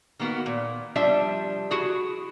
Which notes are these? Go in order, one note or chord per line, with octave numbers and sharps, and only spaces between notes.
D#3 A#3 B3 F#4
A#2
F3 G3 D4 E5
E4 F#4 G#4